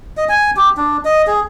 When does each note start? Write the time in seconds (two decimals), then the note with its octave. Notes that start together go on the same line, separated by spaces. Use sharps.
0.17 D#5
0.29 G#5
0.57 G4
0.77 D4
1.05 D#5
1.27 G#4